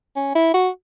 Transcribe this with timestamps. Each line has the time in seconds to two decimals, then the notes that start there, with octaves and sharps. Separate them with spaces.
0.16 C#4
0.35 E4
0.54 F#4